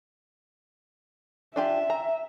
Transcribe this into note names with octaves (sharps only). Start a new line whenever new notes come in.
D4 F4 G4 E5
A#5